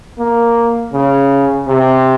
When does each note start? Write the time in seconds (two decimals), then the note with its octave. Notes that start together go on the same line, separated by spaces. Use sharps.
0.19 A#3
0.93 C#3
1.68 C3